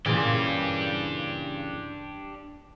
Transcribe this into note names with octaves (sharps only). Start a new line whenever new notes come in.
A#2 C#3 E3 D4 G4